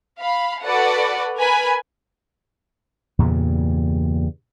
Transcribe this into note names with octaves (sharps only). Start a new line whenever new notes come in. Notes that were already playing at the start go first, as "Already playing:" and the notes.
F5 B5
F#4 A4 B4 D5 F#5
A#4 B4 G#5 B5
E2 G2 A#2 C#3